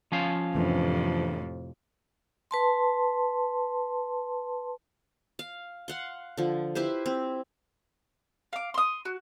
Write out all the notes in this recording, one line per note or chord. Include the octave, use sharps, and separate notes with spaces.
F3 C#4 F5
F2 A2 C3 E3 A3 D4
B4 A5 C6
F5
F5 F#5 C6
D3 F3
E4 G4 B4 C5
C4
F5 D6
C6 D#6
F#4